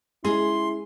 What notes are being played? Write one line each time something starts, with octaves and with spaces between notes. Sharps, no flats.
G#3 C#4 E4 G#4 C6